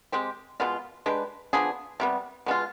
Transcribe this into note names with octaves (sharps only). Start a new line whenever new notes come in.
G#3 C4 G4
B2 G#3 B3 F4
G#3 D4 G4 B4
F3 B3 D4 G#4
C3 G3 B3
B2 G#3 B3 F4